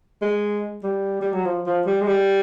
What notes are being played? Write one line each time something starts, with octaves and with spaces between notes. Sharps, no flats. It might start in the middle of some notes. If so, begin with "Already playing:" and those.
G#3
G3
G3
F#3
F3
F3
G3
G#3
G3